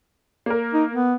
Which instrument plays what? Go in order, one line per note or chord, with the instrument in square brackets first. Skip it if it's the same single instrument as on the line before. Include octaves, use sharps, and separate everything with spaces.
[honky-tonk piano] A#3 A#4
[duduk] D#4
B3